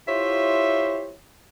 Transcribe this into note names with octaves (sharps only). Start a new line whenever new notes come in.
E4 F4 G4 C5 C#5 E5